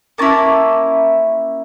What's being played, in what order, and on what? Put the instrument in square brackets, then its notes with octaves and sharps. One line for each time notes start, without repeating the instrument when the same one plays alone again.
[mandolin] A#3 C#4 E4 A5